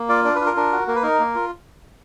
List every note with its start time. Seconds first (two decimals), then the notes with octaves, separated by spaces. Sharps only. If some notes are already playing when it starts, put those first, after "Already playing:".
Already playing: A#3
0.09 F4 D5
0.24 D4 D5
0.35 B4
0.41 F4
0.46 A#4
0.56 D4 A#4
0.72 F#4
0.87 A#3 A#4
0.95 B4
1.02 D#4 A#4
1.19 A#3
1.35 F4